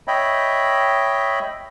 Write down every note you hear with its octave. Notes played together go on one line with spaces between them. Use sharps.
C#5 D#5 E5 G5 B5